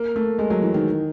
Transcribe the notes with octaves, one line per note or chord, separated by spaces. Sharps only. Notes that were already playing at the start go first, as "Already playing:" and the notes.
Already playing: A#3
A3
G#3
F#3
E3
D#3